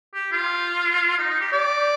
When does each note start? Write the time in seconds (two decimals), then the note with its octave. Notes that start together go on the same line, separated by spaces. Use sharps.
0.14 G4
0.31 F4
1.18 D#4
1.30 D#4
1.41 G4
1.52 D5